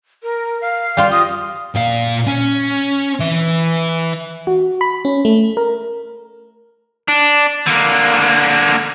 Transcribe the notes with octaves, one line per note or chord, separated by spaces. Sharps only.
A#4
F5
G3 F4 C5
D#6
A#2 F5
C#4
E3 E4
F#4
B5
C#4
A3
A#4
D4
D3 A#3